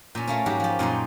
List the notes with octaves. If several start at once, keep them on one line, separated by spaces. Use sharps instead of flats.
A#2 C#4
A3 A#3 C#4
G#2 F#3 G4
F3 G4
F#2 A#2 D#4 C6